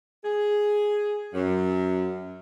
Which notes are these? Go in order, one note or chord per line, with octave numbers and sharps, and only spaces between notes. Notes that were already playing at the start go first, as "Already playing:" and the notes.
G#4
F#2